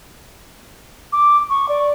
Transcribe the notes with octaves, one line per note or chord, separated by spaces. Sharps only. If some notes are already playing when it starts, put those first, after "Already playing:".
D6
C#6
D5